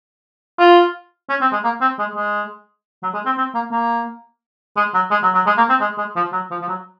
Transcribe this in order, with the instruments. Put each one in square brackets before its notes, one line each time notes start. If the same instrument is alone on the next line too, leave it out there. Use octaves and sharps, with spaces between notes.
[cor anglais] F4
C#4
C4
G#3
A#3
C4
G#3
G#3
F#3
G#3
C4
C4
A#3
A#3
G#3
F#3
G#3
F#3
F#3
G#3
A#3
C4
G#3
G#3
F3
F#3
F3
F3
F#3